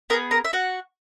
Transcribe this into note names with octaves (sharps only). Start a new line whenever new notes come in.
B3 E4 G#4 A#4 A#5
A#4 A#5
E5
F#4 F#5